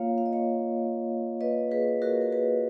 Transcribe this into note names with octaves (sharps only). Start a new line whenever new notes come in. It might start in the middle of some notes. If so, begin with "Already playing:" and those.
Already playing: A#3 F4 C#5 F5
F5
D#5
C#5 F5
B4 D#5
G#4 B4
F#4 A#4
A#4
G#4 B4